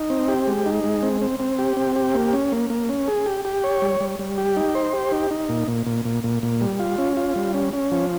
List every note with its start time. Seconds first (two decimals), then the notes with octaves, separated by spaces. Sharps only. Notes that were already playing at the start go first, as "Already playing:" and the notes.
Already playing: D#4
0.10 C4
0.28 G4
0.47 G#3
0.66 D#4
0.84 G#3
1.03 C4
1.21 C4
1.40 C4
1.59 G4
1.77 C4
1.96 G4
2.15 A#3
2.33 C#4
2.52 A#3
2.70 A#3
2.89 C#4
3.08 G#4
3.26 G4
3.45 G4
3.64 C#5
3.82 G3
4.01 G3
4.19 G3
4.38 G4
4.57 D#4
4.75 C5
4.93 G4
5.12 D#4
5.31 D#4
5.49 A#2
5.68 A#2
5.86 A#2
6.05 A#2
6.24 A#2
6.43 A#2
6.61 G3
6.80 F4
6.98 C#4
7.17 F4
7.36 G3
7.54 C#4
7.73 C#4
7.92 F3